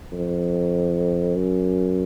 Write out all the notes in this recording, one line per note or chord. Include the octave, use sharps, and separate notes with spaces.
F2
F#2